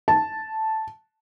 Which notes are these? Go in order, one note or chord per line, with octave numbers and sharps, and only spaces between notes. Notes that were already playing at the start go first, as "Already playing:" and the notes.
A5